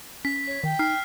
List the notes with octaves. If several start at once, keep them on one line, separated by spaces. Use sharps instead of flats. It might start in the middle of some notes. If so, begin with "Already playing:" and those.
C#4 B6
C#5
D#3 G5
D#4 F6 C7